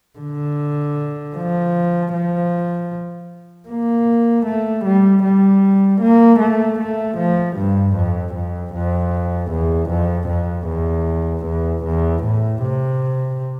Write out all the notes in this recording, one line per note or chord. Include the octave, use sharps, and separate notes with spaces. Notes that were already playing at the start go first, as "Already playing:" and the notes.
D3
F3
F3
A#3
A3
G3
G3
A#3
A3
A3
F3
G2
F2
F2
F2
E2
F2
F2
E2
E2
E2
A2
C3